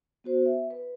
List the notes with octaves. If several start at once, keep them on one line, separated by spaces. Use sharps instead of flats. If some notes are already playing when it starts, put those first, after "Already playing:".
B3 F#4 C5
E5
B4